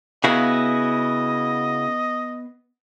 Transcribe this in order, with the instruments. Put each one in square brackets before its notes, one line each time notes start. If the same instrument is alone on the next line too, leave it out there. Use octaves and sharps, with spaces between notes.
[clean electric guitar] C#3 E4 F#4 [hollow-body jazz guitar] B3 F5 [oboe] D#5